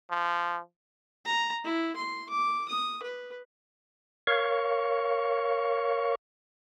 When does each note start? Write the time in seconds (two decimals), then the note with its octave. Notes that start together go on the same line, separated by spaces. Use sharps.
0.10 F3
1.26 A#5
1.65 E4
1.96 C6
2.30 D6
2.69 D#6
3.03 B4
4.27 A#4 C#5 F5 C#6